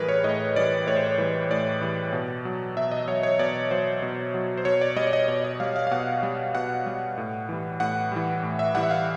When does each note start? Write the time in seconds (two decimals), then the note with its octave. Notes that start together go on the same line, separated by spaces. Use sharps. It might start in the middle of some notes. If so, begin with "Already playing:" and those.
Already playing: A2 E3 G3 G#4 A#4 B4
0.09 C#5
0.24 A2 D#5
0.56 E3 G3 D5
0.87 A2 C#5
0.97 C5
1.06 C#5
1.18 E3 G3
1.50 A2 D5
1.81 E3 G3
2.13 B2
2.45 F#3
2.76 B2 E5
2.91 D#5
3.08 F#3 C#5
3.23 C#5
3.39 B2 D5
3.71 F#3 C5
4.02 B2
4.34 F#3
4.57 C5
4.65 B2 C#5
4.81 D5
4.96 G3 D#5
5.07 D5
5.13 D#5
5.28 B2 C#5
5.44 D#5
5.60 G3 F5
5.76 F5
5.87 F5
5.91 B2 F#5
6.23 G3
6.55 B2 F#5
6.86 G3
7.17 A2
7.49 E3 G3
7.80 A2 F#5
8.12 E3 G3
8.43 A2
8.59 E5
8.75 E3 G3 F#5
8.83 E5
8.91 F5